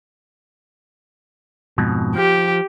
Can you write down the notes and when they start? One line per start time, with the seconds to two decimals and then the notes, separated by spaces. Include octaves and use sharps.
1.78 F2 G#2 B2
2.16 F3 G4